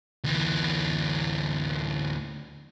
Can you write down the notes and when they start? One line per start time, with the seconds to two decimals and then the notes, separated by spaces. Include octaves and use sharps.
0.24 D2 E3